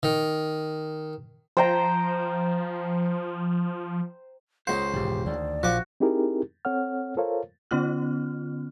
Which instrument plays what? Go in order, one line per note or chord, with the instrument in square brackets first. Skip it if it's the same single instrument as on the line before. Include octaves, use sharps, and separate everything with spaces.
[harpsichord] D#3
[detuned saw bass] F3 [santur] C5 G5 A#5
[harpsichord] C#2 F#5 [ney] G#4 [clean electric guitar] C5
[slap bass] E1 G#2 D#3 [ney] G4
[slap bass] D2 D#3 [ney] D5
[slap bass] A#1 [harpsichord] F3 D6 [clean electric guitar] F#4
[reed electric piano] C4 D#4 E4 G4 G#4 A#4
C4 A4 C#5 F#5 F6
F4 A4 A#4 C5 C#5 F5
[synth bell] D3 B3 C#4 F4 F6